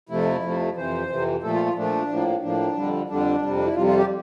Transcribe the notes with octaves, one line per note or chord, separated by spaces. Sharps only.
F2 C3 F3 A3 E4
F2 C3 F3 A3
F2 C3 E3 C5
F2 C3 E3
A#2 F3 A3 A4
F4
F4
A#2 F3 A3 D4
A2 F3 A#3
A2 F3 A#3 D4
F2 D3 G3
F2 D3 G3 D4
F2 C3 G3
D4
E4
F2 C3 G3 F4
F4
G4